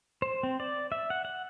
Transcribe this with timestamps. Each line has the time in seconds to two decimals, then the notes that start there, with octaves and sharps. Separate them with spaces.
0.22 C5
0.43 C4
0.60 D5
0.92 E5
1.10 F#5
1.25 F#5